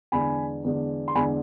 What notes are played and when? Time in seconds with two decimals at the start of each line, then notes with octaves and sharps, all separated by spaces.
0.12 E2 D3 G#3 D4 G#5 B5
0.64 E2 D3 G#3 D4
1.08 C6
1.15 E2 D3 G#3 D4 G#5 B5